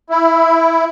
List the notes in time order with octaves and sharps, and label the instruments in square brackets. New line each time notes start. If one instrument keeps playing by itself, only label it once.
[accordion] E4